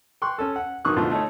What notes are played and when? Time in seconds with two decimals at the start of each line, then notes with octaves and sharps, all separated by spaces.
0.22 G5 C6 C#6 F#6
0.38 C#4 A4
0.56 F#5
0.85 B1 D#3 A#3 C#6 D#6 F#6
0.96 A#1 B2 D3 F3 A3 F4
1.11 A3 D#4 C#5